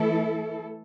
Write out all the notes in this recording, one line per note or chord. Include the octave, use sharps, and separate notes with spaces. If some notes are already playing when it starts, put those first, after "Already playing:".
Already playing: E3 A3 E4 A4